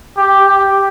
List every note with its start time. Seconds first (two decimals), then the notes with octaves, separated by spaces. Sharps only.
0.17 G4
0.47 G4